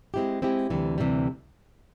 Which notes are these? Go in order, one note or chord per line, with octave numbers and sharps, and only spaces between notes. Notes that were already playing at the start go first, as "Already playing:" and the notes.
G#3 C4 E4 G4
G#3 C4 E4 G4
D2 C3 E3 G3
D2 C3 E3 G3